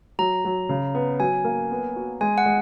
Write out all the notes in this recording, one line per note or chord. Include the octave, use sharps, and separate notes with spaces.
F#3 A#5
F#3
C#3
B3
F#3 G#5
A#3
B3
F#4
G#3 G#5
F#5
G#3